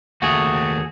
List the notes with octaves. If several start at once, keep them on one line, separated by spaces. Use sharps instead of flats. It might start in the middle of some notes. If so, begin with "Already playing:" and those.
D#2 A3 F#4 G#4